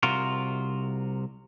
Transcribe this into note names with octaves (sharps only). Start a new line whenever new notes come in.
C2 C3 F4 F#4 A#4